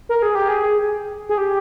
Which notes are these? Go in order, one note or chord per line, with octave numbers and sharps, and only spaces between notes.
A#4
G#4
G4
G#4
G#4
G4